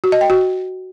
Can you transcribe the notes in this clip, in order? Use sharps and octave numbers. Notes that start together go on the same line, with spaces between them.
F#4
D#5
G5
F#4